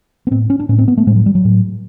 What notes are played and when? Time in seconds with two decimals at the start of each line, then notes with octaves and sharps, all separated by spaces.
0.27 B3
0.31 A2 C4
0.50 C#4
0.59 D4
0.69 A2 C#4
0.78 C4
0.88 B3
0.98 A3
1.07 A2 G#3
1.16 F#3
1.26 G3
1.35 F#3
1.45 A2